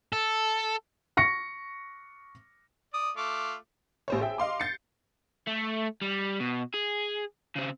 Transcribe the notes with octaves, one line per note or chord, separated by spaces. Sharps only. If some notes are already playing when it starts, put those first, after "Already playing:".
A4
C#6 A#6 C#7
D5 D#6
A3 F4 D6
A1 C5 C#5
G#4 E5 G5
D#5 F5 C6 D6
G6 A6 C7 C#7
A3
G3
B2
G#4
C#3 C4